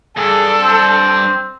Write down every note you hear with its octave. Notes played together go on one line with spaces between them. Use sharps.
G2 D4 G#4 A4
C4